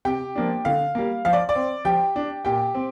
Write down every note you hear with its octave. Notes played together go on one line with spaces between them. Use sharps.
C3 G4 G5
F3 A#3 D4
D3 F5
G3 A#3
F3 F5
D5
D5
C4
F3 G4 G5
D4
A#2 G4 G5
C4